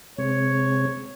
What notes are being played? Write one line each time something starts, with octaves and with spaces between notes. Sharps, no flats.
C3 G#3 C4 C#5